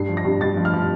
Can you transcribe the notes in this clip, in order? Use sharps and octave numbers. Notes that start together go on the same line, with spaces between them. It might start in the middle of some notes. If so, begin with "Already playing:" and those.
Already playing: G2 C7
F3
A#6
G2
G2 A6
F3
F6
F3